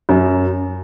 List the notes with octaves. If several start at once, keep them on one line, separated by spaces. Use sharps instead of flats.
F#2